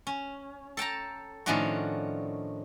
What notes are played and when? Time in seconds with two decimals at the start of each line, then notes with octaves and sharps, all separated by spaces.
0.07 C#4
0.77 A4 G5 A5 A#5
1.46 A2 D#3 F3 C#4 D4 F#4